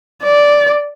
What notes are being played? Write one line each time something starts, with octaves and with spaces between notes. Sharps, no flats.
D5